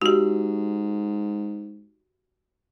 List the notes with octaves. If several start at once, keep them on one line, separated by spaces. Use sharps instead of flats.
G#2 F#4 G4